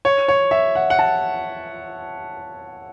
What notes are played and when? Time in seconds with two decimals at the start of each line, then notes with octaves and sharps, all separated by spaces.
0.05 C#5
0.28 C#5
0.51 E5
0.75 F#5
0.90 F#5
0.99 A5